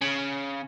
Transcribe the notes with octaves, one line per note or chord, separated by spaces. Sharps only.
C#3